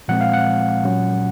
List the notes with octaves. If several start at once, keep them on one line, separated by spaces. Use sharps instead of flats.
A#2 F3 G#3 C4 F#5
F5
F#5
A#2 F#3 C#4